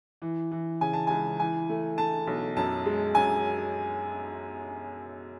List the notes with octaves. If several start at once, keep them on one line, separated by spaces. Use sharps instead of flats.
E3
E3
C#3 G#5
A5
C#2 G#5
E3 G#5
A3
A3 A5
B1
F#2 A5
G#3
F#2 G#5